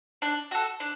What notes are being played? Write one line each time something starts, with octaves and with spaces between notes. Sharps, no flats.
D4
F#4 A4
D4